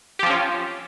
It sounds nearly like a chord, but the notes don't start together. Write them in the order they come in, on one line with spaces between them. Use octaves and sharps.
G4 F3 C4 C#4 F4